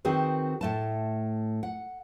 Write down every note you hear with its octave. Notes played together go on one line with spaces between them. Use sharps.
D#3 C4 F#4 G#4 B4
A2 A3 A5
F#5